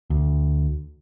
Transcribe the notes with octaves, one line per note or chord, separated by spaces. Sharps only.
D2